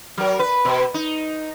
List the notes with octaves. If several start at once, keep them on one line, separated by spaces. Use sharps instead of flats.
F#3 A#4
B4
B2
D#4